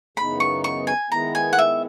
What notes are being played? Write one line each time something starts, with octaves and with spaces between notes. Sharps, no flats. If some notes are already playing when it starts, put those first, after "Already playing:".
F#2 C#3 E3 B3 D#4 B5
C#6
C#6
G#5
D#3 G#3 B3 E4 A#5
G#5
F#5
E5